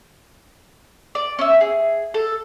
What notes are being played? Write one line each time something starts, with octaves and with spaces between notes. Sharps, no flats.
D5
C#4 E5
G#4
A4